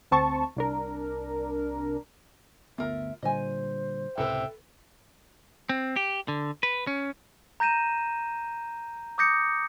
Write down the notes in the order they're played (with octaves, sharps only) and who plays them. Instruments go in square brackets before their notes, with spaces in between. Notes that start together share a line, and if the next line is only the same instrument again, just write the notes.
[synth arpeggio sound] D2 C4 A5 C#6
C2 D4 A#4
[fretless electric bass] G1 D2 B3 [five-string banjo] F4 A#4 [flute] E5
[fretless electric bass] A#2 D3 G3 [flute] C5 [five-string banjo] D#5 G#5
[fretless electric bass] C#2 A2 C3 [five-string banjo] A4 B4 [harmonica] E5 G5
[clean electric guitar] C4
G4
D3
B4
C#4
[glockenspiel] A#5 G6 A#6 D#7 E7
D6 D#6 G6 A#6 C#7